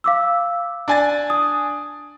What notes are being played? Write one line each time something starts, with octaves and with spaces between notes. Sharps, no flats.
F5 D6 E6
D4 G#5 A6
D#6